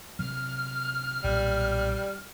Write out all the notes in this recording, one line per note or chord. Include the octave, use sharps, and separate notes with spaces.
C3 F#3 F6
B1 A#2 G3